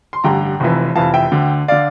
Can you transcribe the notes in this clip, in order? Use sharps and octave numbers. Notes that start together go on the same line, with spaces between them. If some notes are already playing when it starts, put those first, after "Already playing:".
C6
A1 G2 D3 G5 A#5
F1 F2 E3
F1 F2 E3 F5 A5
E5 G5
D2 D3
D3 D5 F5